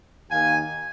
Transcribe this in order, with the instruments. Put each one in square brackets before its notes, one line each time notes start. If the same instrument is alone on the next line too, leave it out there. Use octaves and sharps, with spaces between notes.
[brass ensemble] D#2 D#3 A#3 F5 G#5